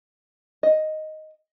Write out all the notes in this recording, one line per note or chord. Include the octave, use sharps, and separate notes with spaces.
D#5